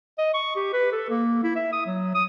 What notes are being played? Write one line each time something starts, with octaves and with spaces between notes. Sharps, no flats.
D#5
C#6
G4
B4
A4
A#3
E4
E5
D#6
F#3
D#6